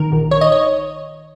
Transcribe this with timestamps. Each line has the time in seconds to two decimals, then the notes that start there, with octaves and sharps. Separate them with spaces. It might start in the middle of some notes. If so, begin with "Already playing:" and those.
Already playing: D#3 A#4
0.12 A#1
0.31 D#3 C#5
0.41 D#5
0.52 C#5